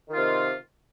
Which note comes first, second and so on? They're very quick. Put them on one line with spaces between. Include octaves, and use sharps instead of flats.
D#3 F4 C3